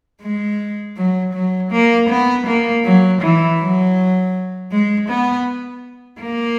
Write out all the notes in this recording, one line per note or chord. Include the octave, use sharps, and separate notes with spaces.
G#3
F#3
F#3
A#3
B3
A#3
F#3
E3
F#3
G#3
B3
A#3